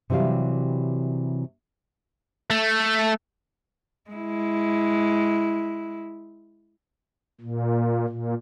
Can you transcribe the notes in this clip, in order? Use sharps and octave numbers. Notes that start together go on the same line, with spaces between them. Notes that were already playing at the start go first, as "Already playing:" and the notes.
C3 E3 F#3 G3 F5
A3
G#3 E4
A#2
A#2